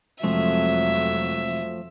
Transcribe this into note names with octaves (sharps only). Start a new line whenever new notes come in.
F2 C3 F3 F#3 G#3 A3 C4 E5